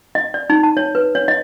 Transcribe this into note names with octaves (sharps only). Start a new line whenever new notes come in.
D#5
D5
D#4
A5
C#5
B4
C#5
D#5